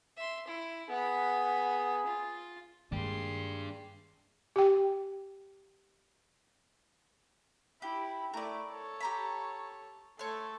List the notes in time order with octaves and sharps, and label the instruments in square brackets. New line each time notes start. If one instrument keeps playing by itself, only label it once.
[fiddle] E5 C6
E4
[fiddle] B3 B5 [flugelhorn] G#4 [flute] F#5
[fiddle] F4
[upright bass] G2 [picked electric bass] D#3 G#3 A#3 [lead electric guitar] D4 G4 [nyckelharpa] G#4 C6
[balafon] G4 G5
[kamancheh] E4 B5 [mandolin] G4
[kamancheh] A3 E4 [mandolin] A#4 D5
[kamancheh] A4 C#5
[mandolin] G4 A#5 B5
[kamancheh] A3 A4 [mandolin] C#5 C6